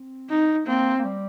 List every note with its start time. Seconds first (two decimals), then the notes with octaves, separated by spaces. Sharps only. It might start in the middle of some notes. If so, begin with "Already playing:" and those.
Already playing: C4
0.29 D#4
0.66 A#3 C4
0.99 A#3
1.05 G3